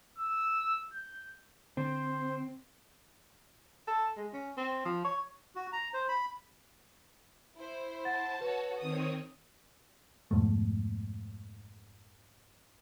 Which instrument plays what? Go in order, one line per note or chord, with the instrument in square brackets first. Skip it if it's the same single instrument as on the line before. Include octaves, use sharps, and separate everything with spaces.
[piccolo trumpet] E6
G6
[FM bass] D3 [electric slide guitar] C4 [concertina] C5
[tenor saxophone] A4
G#3
C#4
C4
F3
C#5
[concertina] F#4
A#5
C5
B5
[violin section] E4 C5
[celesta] F#5 A6 [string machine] A5
[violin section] F#4 A4 C#5 [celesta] B4
[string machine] D#3 C4 C#5 [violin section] D#6
[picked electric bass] F2 G#2 B2 A3